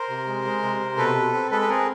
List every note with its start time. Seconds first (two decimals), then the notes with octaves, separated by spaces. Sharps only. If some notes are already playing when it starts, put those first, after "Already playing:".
Already playing: A#4 C5
0.09 C3
0.27 G#3
0.45 G#3
0.63 C3
0.81 C3
0.98 B2 A4 B4
1.15 B2
1.33 C4
1.51 G#3 A4 B4
1.61 B4
1.68 C4 G#4 A#4